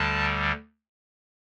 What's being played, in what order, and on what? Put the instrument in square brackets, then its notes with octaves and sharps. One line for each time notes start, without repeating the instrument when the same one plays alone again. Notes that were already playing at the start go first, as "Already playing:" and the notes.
Already playing: [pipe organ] D2 D3 G3 A5